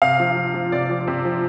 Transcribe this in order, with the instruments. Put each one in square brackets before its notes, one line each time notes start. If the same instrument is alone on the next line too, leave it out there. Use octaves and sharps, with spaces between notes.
[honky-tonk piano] C3 F5
F3
F3
F3
C3 D5
F3
C3
F3